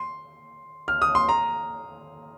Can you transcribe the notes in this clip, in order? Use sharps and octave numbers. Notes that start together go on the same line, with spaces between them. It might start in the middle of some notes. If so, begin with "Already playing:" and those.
Already playing: C6
F6
D#6
C6
A#5